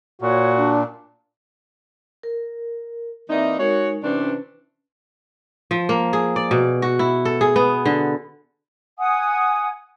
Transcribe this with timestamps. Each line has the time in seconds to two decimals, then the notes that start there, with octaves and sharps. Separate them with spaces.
0.22 A#2 F#4 C#5
0.57 D4
2.23 A#4
3.29 E3 A#3 C4 D#4 D5 E5
3.59 G#3 D#4 F#4 A#4 C#5
4.04 C3 E3 C#4 D4 B4
5.71 F3
5.89 A#3
6.13 G#4
6.36 D5
6.51 B2
6.82 F#4
6.99 E4
7.25 A4
7.41 G#4
7.56 B3
7.86 D3
8.97 F#5 G#5 D#6